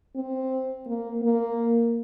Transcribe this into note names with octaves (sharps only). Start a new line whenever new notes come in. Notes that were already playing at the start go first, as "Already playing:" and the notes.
C4
A#3
A#3